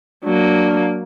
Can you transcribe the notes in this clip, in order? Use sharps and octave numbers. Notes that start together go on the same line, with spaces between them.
F#3 A#3 D4